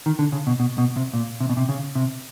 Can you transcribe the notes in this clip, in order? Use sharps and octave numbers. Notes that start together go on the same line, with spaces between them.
D#3
D3
C#3
B2
B2
B2
C3
A#2
C3
B2
C3
C#3
C3